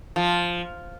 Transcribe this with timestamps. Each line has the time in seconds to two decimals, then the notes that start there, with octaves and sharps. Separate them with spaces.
0.16 F3